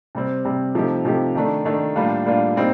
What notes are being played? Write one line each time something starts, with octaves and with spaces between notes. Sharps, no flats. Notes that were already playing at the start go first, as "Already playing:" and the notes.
C3 G3 C4
C3 G3 C4
C3 F3 A3 D#4 G4
C3 F3 A3 D#4 G4
D#3 A3 D4
D#3 A3 D4
A2 G3 A#3 D4 F4
A2 G3 A#3 D4 F4
A#2 G3 C4 D#4